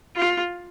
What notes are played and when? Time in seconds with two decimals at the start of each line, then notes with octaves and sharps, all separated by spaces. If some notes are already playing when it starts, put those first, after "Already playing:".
0.16 F4